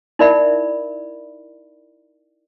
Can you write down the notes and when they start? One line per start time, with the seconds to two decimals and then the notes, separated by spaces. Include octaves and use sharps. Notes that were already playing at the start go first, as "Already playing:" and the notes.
0.19 D#4 E4 A#4 D5 E5 B5